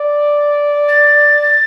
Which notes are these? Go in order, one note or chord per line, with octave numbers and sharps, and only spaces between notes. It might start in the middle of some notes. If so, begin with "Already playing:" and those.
Already playing: D5
A6